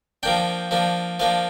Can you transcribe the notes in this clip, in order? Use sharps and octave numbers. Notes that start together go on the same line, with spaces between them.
F3 A#3 D4 G5
F3 A#3 D4
F3 A#3 D4 F5